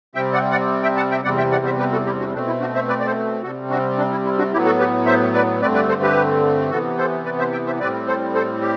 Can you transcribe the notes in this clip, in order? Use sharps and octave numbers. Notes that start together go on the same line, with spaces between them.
C3 G3 C4 E5 G5
D5 F#5
D5 F#5
E5 G5
F#5 A5
E5 G5
E2 C3 G3 C4 D5 F#5
E5 G5
D5 F#5
C5 E5
G4 B4
F#4 A4
E4 G4
D4 F#4
B2 A3 C4 D4
E4
D4 F#4
C5 E5
B4 D5
D5
A4 C5
C3 G3 C4 F#4 A4
D4 F#4
D4
E4
E4
D4 F#4
A2 F#3 B3 E4 G4
F#4 A4
G4 B4
C5 E5
B4 D5
G2 D3 A3 C4 B4 D5
B4 D5
A4 C5
G4 B4
C3 E3 B3 F#4 A4
A4 C5
B4 D5
C5 E5
E5 G5
C5 E5
A2 G3 C4 B4 D5
A4 C5
A4 C5
G4